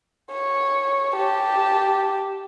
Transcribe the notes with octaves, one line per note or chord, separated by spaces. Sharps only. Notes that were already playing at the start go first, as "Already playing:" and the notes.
C#5
G4 A5